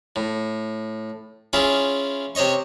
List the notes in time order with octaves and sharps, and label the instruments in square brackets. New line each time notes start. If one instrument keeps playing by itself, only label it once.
[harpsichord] A2
C#4 E4 F4 G#4
C3 C5 C#5 D#5 C#6